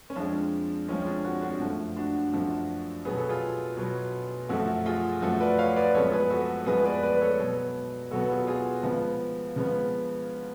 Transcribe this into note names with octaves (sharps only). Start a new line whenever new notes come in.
C#4
F2 F3 G#3 D4
F2 F3 G#3 C#4
D4
D4 F#4
D4 F#4
F#2 F3 A3
D4 F#4
F#2 F3 A3
B2 F#3 B3 G#4
A4
F4 G#4
B2 F#3 B3
F#2 F3 A3 F#4 A4
F4 G#4
F#2 F3 A3 F#4 A4
B4 D5
C#5 F5
B4 D5
F#2 F3 G#3 B3 A4 C#5
G#4 B4
F#4 A4
F#2 F3 G#3 B3 G#4 B4
B4 D5
B4 D5
B4
A4 C#5
B2 F#3 B3
B2 F#3 B3 F#4 A4
F4 G#4
F4 G#4
C#3 F3 G#3 B3
C#3 F3 G#3 B3